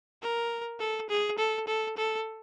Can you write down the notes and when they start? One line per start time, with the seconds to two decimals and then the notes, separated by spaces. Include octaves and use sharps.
0.22 A#4
0.80 A4
1.09 G#4
1.38 A4
1.67 A4
1.97 A4